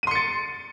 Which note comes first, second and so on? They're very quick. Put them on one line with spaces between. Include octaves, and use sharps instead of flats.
D#7 C6 C#7 A6